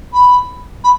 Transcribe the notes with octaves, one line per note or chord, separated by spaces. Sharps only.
B5
B5